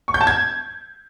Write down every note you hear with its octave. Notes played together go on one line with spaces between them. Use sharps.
C#6
G6
A5
G#6